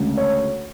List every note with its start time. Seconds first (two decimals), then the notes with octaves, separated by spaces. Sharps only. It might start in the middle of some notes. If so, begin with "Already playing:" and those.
Already playing: D2 C#3 G#3
0.17 C#5